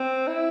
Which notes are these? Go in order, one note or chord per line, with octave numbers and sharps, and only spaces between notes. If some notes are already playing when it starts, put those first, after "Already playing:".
Already playing: C4
E4